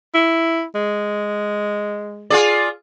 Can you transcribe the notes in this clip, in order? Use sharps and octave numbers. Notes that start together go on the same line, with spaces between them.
E4
G#3
F4 G#4 D5